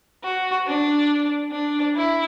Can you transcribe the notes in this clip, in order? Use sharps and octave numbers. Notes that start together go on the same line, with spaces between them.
F#4
D4
D4
E4